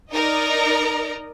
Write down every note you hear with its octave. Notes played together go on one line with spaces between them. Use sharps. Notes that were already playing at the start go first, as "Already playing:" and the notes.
D#4 A#4 D5 D#5 A#5